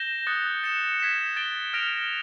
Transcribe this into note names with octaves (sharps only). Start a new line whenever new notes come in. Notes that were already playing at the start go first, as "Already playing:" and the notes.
Already playing: G6 A#6 E7 G7
D#6 F#6 A6 C#7
A6 C#7 E7
G#6 B6 E7
A6 D7 G7
F6 A#6 D7 F7